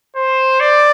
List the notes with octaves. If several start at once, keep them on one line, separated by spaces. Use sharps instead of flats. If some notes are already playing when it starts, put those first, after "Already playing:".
C5
D5